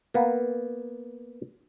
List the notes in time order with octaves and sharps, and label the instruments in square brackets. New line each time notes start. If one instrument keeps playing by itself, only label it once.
[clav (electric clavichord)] A#3 B3